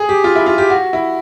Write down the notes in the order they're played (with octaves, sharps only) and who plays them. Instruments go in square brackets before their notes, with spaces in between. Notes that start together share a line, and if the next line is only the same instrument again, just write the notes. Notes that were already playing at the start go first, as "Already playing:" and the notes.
Already playing: [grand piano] G#4
G4
F4
E4
F4
G4
F#4
E4